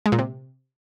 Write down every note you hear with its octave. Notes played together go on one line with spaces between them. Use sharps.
G#3
A#2
C3